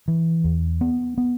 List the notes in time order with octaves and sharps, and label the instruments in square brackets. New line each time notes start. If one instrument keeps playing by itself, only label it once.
[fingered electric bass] E3
E2
B3
B3